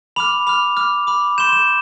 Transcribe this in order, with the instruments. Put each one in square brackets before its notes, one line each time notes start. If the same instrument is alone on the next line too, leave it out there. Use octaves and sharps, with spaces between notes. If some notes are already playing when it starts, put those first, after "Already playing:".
[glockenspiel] B5 D6 F6 F7
B5 D6 F6 F7
B5 D6 F6
B5 D6 F6
C6 G6 E7
E7